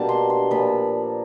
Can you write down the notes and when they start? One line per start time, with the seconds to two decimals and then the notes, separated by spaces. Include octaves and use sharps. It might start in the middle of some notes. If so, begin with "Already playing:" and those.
Already playing: B2 G3 A#3 D4 A5
0.09 C6
0.30 C6
0.51 A#2 F3 A#3 B5